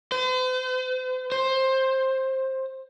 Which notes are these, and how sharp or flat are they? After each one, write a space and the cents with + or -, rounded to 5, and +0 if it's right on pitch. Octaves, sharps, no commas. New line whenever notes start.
C5 -45
C5 +15